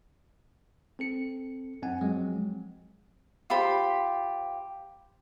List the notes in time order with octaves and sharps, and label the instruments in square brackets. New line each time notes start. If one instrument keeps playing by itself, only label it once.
[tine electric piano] C4 A4 C#7
F#2 C4 F#5 G#5
F3 F#3 G#3 C4
[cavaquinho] F4 G4 C5 B5